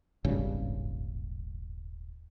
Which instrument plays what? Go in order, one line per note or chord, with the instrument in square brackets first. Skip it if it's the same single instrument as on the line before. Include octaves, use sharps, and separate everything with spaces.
[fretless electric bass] D#1 G#1 G2 C#3